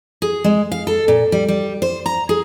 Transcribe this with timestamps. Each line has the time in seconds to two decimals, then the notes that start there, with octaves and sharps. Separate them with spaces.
0.22 G#4
0.44 G#3
0.72 F5
0.87 A4
1.08 A#2
1.32 G3
1.48 G3
1.82 C5
2.06 A#5
2.29 G#4